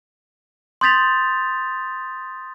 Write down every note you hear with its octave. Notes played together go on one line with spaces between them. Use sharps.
C6 D#6 G6 A6 B6 F7